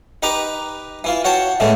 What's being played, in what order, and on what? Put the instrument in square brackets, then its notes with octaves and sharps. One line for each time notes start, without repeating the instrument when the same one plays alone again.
[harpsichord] D#4 G4 B4 A#5 D6
E3 E4 F4
F#4 C#5 G5 A5
A2 E3 G#3 A3 C#4